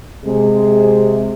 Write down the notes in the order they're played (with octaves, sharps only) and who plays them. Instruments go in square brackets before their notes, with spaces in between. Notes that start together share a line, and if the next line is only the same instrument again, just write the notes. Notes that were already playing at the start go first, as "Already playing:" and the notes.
[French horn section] C3 G#3